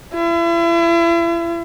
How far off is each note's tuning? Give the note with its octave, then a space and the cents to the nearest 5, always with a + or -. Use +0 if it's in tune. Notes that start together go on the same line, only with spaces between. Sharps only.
E4 +40